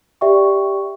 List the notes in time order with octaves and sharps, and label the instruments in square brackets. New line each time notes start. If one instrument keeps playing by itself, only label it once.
[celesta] G4 D5 E5 G5 C#6